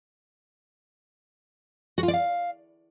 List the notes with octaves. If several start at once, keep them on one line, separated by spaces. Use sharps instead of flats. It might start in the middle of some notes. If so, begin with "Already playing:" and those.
F#4
F4
D5
F5